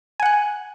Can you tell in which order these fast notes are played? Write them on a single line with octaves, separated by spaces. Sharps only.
G#5 F#5 F#6